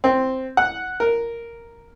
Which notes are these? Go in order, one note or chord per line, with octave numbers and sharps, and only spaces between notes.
C4
F#5
A#4